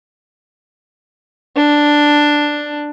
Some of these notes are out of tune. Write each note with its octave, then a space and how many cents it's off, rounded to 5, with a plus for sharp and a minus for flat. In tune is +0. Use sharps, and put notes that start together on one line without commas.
D4 +5